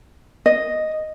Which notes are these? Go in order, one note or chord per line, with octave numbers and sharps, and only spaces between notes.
D#5